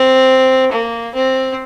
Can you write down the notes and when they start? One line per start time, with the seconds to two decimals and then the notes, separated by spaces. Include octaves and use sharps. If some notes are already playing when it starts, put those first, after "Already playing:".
Already playing: C4
0.71 A#3
1.15 C4